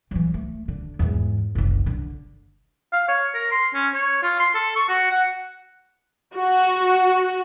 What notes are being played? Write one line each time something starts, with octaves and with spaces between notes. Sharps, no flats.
E3 F#3
A3
D3
E2 G#2
F#1 C2
D3
F5
C#5
A#4
C6
C#4
C#5
F4
C6
A4
C#6
F#4
F#5
F#4